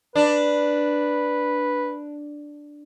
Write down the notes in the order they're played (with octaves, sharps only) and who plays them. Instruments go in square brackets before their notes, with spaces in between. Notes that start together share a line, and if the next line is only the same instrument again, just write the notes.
[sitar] D4 [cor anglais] B4